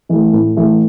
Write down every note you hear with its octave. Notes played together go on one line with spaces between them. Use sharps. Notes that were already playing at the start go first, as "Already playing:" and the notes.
E3 A3
A2
E3 A3